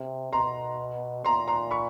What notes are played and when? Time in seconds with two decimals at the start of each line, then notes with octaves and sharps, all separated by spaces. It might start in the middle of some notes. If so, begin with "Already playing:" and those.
Already playing: C3
0.33 B2 A#5 C6
1.25 A#2 A#5 C6
1.48 A#5 C6
1.71 B5 C#6